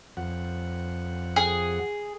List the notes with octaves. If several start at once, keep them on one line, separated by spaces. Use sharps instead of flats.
F2 F#5
G#4